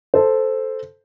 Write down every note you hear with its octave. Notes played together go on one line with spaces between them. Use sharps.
A4 C5